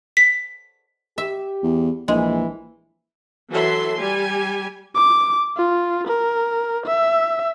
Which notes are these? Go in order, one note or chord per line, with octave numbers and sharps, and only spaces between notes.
B6
G4 E5
E2
A#1 E3 G#3
E3 F#3 A4 E5 C6
G3 G4 G#5
D6
F4
A#4
E5